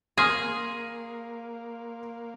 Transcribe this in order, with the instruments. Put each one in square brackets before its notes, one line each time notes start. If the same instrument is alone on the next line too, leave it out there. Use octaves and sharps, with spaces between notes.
[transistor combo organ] A#3 [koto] G#4 [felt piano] C6 F6 A#6